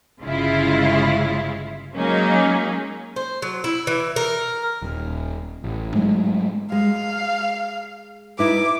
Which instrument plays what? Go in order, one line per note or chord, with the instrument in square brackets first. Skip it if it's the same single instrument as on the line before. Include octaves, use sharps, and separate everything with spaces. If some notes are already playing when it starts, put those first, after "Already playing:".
[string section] G1 C#3 G#3 E4 F4
F#3 G#3 A#3 C#4 D#4
[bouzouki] C5
F#3
E4
E3
A#4
[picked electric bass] D#1
A1
G#2 F#3 G#3 A3
[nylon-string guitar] G#3 [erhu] F5
[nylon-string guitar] D#4 E4 B4 [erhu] D6